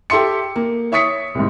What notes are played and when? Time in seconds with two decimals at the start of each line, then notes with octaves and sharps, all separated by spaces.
0.10 G4 A4 E5 C6 C#7
0.56 A#3
0.92 C#5 E5 C#6 D#6 B6 C#7
1.35 C2 G#2